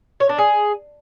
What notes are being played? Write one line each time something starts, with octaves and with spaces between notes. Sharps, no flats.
C#5
D4
G#4